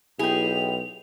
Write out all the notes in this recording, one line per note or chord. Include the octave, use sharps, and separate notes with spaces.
B1 E4 G4 G#4 G5 F7